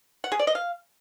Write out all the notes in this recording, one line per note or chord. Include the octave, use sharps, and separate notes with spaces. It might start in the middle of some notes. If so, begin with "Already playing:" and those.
F#5
G#4
D5
D#5
F5